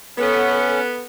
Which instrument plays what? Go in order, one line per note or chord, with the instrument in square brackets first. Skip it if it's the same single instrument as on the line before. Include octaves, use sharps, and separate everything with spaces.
[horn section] B3 [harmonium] C#4 [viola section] A4 F#5